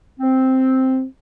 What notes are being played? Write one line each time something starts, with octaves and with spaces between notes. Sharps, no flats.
C4